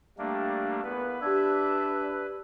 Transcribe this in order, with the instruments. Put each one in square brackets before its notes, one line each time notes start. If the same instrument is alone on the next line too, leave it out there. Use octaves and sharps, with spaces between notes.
[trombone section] G3 [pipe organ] A3 A#3 D4
[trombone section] E2 A#3 B3 [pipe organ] B4
[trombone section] D4 [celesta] G4 G#6 [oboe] E5